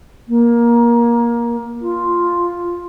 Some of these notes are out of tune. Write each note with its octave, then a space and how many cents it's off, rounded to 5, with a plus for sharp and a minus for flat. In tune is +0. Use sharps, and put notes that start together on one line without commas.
A#3 +20
F4 +0